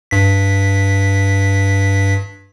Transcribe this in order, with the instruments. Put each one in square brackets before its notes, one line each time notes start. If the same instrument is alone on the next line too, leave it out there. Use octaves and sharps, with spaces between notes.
[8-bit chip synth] G2 B6